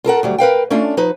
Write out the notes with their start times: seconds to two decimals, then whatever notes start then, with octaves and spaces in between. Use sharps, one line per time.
0.04 F4 A4 A#4 F#5
0.23 D2 F#3 G3
0.38 A#4 B4 F5 G5
0.70 A3 C#4 D4 F4
0.97 F3 D#4 B4